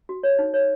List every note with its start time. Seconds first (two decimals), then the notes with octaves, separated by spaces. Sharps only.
0.09 F#4
0.23 C#5
0.39 D#4
0.54 C#5